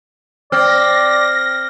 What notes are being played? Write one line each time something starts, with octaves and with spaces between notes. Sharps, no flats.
C4 D5 F6 A#6